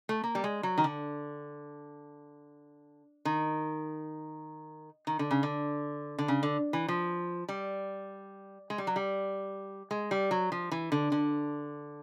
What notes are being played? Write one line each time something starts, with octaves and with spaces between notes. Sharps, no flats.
A3
A#3
G3
G#3
F#3
D#3
D3
D#3
D#3
D3
C#3
D3
D3
C#3
D3
E3
F3
G3
G#3
G3
F#3
G3
G#3
G3
F#3
F3
E3
D3
D3